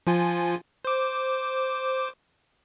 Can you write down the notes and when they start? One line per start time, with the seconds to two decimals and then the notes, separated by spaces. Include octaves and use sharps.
0.07 F3 F4 G#5
0.85 C5 D6